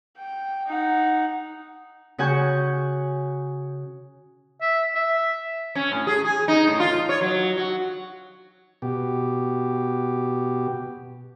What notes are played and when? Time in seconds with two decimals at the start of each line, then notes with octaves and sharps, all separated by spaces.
0.18 G5
0.68 D#4 F#5
2.18 C#3 F#4 F#5 G#5 C#6 G6
4.61 E5
4.95 E5
5.75 C#4
5.92 A2
6.07 G#4
6.24 G#4
6.48 D#4
6.67 A2
6.80 F4
7.09 C#5
7.21 F#3
7.58 F#4
8.82 B2 G4